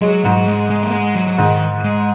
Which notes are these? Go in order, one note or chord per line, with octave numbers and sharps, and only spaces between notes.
F#3 G#3
G#2 F#3
G#3
G#3
A#3
G#3
F#3
F#3
G#2 D#3
G#3